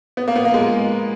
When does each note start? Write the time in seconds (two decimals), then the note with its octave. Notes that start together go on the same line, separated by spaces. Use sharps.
0.17 B3
0.28 A#3
0.36 B3
0.45 A#3
0.54 G#3